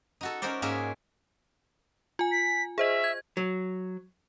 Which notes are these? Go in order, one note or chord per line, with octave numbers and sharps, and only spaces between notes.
D#4 F#4 A4
C#4 D#4 F#4 A#4 C5 D5
G#2 A#3 C#4 G#4 A#4 E5
F4 G#5
B6
G#4 C5 D#5 E5
G#6
F#3